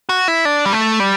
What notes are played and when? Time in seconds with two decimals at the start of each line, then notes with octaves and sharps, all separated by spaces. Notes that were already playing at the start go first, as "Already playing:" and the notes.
0.09 F#4
0.28 E4
0.45 D4
0.66 G3
0.73 A3
1.00 G3